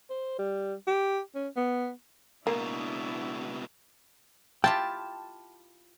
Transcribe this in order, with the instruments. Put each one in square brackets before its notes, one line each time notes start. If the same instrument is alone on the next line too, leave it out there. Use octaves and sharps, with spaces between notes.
[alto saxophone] C5
G3
G4
C#4
B3
[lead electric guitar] C#2 B2 [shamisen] A#3 [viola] D4 E4
[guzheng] E4 F4 G4 [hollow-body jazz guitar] G5 [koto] A5